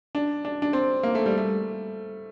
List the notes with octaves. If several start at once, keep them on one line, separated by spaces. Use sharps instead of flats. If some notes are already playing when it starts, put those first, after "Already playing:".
D4
D4
D4
C4
A#3
A3
G3
A3